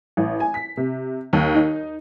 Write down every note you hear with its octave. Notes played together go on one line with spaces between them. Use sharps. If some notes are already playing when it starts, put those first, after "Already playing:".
A1
G#5
B6
C3
D#2
D#4